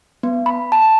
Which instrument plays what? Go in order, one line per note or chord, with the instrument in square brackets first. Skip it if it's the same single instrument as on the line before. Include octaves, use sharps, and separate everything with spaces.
[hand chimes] B3
B5
A5